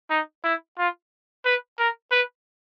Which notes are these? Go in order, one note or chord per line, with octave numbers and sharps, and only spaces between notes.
D#4
E4
F4
B4
A#4
B4